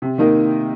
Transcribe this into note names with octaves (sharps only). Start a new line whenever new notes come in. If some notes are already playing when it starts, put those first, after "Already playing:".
C3
D#3 A#3 D#4 A#4